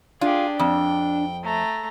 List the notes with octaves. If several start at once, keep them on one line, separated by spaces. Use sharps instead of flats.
D4 F4 G4 G#4
F2 G5
A3 A#5